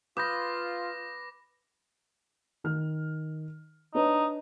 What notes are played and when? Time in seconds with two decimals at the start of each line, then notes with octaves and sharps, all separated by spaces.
0.17 F4 B4 D6 D#6 G6 A#6
2.64 D#3 F6
3.95 D4 D#4 B4 C#5